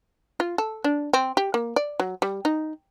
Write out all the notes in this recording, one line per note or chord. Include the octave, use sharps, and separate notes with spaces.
F4
A4
D4
C4
G4
A#3
D5
F#3
G3
D#4